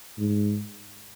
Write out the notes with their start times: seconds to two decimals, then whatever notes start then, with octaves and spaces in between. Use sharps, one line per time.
0.18 G#2